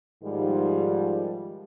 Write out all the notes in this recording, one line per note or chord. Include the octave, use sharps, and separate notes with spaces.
G#2 D#3 F3 G3